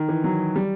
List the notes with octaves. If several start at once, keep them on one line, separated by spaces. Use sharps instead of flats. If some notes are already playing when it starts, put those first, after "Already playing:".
Already playing: D#3
E3
F#3
G3